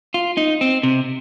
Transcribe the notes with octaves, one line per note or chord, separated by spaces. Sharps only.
F4
D#4
C4
C3